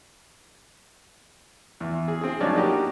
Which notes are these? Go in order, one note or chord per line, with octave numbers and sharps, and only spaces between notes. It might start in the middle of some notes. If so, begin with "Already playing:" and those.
E2
G#4
C4 G#4
F3 F#3 G#3 C#4 D#4 D5
A#3 D4 D#4 F#4 G4